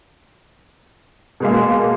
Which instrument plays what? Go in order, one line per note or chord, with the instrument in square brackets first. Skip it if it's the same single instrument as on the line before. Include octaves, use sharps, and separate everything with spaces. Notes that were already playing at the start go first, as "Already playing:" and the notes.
[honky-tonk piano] B2 G#3 A#3